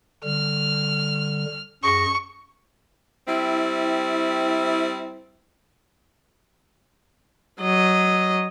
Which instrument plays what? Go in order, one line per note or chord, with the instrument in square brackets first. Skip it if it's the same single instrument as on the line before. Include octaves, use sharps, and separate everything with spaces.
[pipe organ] D3 G3 [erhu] F6
[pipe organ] F#2 G#4 A#6 [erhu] C#6
[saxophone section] G3 C4 E4
[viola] F#3 D#5